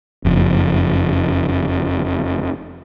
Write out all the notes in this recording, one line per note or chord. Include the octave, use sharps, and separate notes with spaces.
F#1 F2